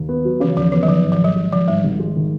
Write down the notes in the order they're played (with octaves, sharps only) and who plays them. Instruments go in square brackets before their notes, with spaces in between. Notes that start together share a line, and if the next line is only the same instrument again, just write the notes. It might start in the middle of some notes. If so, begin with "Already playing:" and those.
Already playing: [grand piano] D#2
B3
F#3
[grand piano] C#3 [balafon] E3
[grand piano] D#2 [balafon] F3
[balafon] E3 [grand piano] B3
[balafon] F#3
[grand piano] D#3 [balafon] F3
[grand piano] G#2
[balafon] F3
[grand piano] G#1 [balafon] F#3
[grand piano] G#3
[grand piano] D#3 [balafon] F3
[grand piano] G#2 [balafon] G3
[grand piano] G#1
G#3
D#3